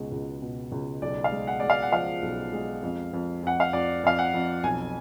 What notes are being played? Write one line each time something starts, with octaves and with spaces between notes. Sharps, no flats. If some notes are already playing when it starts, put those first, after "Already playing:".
Already playing: C#2 B2 G#3
C#2
B2
C#2
B1 D5
F5
G#3
F#5
G#3 D5
F5
F#5
F3 F5
B1
G#3
F2
F2
F2 F#5
F5
F2 D5
F2 F5
F#5
F2
B1 G#5